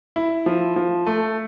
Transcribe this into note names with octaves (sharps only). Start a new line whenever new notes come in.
E4
F3
F3
A3